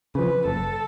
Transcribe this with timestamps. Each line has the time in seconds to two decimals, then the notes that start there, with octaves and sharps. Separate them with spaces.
0.15 C#3 F3 B4
0.45 F#1 A4